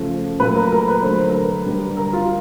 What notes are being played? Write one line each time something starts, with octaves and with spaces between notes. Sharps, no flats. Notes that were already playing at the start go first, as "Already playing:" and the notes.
Already playing: C#3 F3 A3
A#2 F#3 A3 B4
A#4
A#4
B4
D3 F#3 A3 C5
A#4
B4
D3 G3
A#4
F4